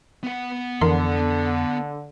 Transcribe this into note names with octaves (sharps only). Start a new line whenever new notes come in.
B3 F#5
F2 D3 E3 A#4 C6